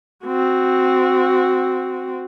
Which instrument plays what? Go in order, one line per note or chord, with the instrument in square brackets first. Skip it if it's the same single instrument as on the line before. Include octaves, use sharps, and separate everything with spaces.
[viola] C4 F#4